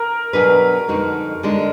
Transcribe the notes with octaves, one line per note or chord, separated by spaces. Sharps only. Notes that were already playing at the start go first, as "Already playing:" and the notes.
Already playing: A#4
B2 F#3 D4 G#4 B4
F2 D3 G#3 D#4 F#4
D3 G#3 D4